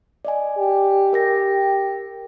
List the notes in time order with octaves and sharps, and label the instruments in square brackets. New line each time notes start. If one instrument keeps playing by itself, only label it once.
[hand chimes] D5 D#5 G#5
[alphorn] G4
[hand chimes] A#4 G5 A#6